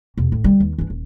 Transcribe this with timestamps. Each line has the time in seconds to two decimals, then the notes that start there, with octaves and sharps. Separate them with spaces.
0.17 E2 B2
0.32 A2
0.44 D3 G3
0.60 D#2
0.78 E3 D4
0.90 D#1